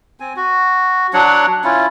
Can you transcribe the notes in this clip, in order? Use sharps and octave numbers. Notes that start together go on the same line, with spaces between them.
C4 G#5
F#4
F#3 D4 C#5 F#5
C#4 E4 F4